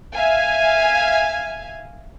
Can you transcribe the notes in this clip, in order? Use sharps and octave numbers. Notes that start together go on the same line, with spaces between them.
E5 F5 G#5